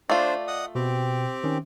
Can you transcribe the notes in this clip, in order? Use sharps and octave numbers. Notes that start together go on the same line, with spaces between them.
A3 D4 F4 C5 D5
D#5 F#5 D#6
B2 C4 G4
D#3 C#4